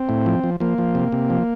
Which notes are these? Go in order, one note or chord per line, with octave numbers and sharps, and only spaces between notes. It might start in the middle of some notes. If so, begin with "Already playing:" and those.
Already playing: C4
A2
F3
F3
F3 A#3
F3
C3
C3
F3